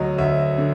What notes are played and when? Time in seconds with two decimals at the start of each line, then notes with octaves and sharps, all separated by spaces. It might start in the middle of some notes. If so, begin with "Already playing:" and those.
Already playing: D2 F#3 D#5
0.18 D2 E5
0.58 D3